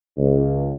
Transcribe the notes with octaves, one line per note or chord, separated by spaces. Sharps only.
C#2